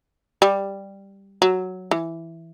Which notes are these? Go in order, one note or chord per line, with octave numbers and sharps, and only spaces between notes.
G3
F#3
E3